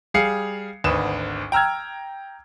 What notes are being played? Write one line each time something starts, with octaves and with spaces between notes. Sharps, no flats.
G3 G#4 F5 C7 C#7
G#1 D2 B4 D#6 E7
G5 A#5 E6 F6 G#6